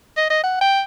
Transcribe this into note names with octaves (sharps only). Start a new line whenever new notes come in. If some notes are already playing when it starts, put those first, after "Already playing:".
D#5
D#5
F#5
G5